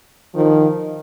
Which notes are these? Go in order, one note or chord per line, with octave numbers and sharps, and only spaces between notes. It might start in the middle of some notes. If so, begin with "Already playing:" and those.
D#3 F3